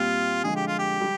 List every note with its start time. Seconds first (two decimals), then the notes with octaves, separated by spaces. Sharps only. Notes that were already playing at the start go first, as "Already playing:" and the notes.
Already playing: A#2 G3 C4 F4
0.44 D3 F3 G#3 G#4
0.56 G4
0.67 F4
0.78 G4
1.01 G3